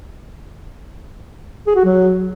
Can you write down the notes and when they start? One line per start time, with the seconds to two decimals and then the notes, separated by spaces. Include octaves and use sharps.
1.67 G#4
1.75 F#4
1.84 F#3